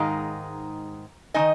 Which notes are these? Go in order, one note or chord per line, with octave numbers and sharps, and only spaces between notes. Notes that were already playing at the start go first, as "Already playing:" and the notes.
Already playing: G#2 D#3 G#3 D#4 F5 A#5
D#3 G#3 D#4 D#5 G#5